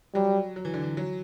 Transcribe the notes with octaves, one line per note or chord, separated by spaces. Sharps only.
F#3 G3
F#3
E3
D3
E3
F#3